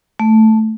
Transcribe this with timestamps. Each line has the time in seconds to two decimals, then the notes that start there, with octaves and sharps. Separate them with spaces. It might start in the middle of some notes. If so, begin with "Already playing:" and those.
0.19 A3